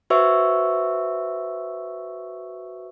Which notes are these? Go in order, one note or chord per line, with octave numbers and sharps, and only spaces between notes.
F#4 B4 C5 E5 C#6 E6